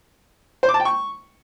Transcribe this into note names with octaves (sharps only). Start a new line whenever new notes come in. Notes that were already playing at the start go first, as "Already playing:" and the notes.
C5
D6
A5
G5
C#6